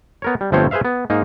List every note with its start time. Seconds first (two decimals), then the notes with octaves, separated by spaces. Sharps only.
0.22 B3 A#4 C#5
0.41 G3
0.52 G1 F3 A3 C4 C5 C#5
0.71 G#4 B4 C5 E5 F5
0.85 B3
1.10 G#2 A#3 D#4